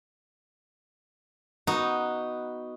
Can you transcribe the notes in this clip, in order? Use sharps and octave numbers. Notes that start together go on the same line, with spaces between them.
B3 D#4 F#4